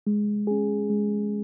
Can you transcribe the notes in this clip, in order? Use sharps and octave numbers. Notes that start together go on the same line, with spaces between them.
G#3
C#4 G#4
G#3